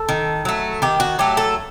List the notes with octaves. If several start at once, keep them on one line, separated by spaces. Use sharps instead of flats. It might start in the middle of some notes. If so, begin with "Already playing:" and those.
Already playing: A4
D#3
F#3 A3
D#3 G4
F#4
F#3 A3 G4
A4